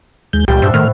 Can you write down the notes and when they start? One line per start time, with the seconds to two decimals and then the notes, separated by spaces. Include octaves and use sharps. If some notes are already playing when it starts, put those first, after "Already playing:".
0.33 D#2 G#3 G6
0.48 C#2 A#2 G3 G4 G5
0.62 G2 C5 E5 F#5
0.74 A2 D#3 A3 F6